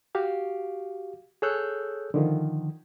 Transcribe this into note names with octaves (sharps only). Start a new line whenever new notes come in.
F#4 G4 F5
G#4 A4 C#5 E6 F#6 G6
D3 D#3 F3